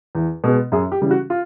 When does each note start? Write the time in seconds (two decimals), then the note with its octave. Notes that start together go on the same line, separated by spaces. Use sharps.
0.15 E2
0.44 B2 G#3 B3
0.72 F#2 G#4
0.92 G4
1.01 C#3 E3 G3
1.11 F#4
1.30 F4